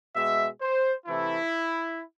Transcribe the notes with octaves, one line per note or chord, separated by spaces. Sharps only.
B2 G#3 E5
C5
C3 E3 A3 E4